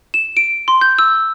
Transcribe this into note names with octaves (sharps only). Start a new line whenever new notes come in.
E7
D7
C6
G6
E6